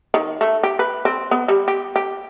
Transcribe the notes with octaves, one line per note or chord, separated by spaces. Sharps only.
D#3
A3
G4
B4
C4
B3
G3
G4
G4